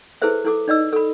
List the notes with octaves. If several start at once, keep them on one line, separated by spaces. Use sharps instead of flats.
E4 G#4 A4 B4 C5 E5
E4 A4 D6
D#4 D5 D#5 E6
A4 B5